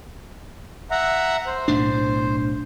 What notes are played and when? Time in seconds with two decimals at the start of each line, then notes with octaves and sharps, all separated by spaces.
0.91 E5 F#5 A#5
1.47 C5
1.68 B1 A2 D4